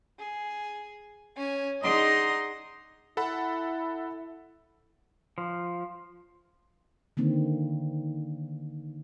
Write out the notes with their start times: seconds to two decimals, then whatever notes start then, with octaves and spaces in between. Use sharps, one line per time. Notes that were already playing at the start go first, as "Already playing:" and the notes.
0.18 G#4
1.36 C#4 G#5
1.82 D4 D#4 G#4 D#5 F#5 C6
3.17 E4 A4 F#5 B5
5.38 F3
7.17 D3 D#3 A#3 C4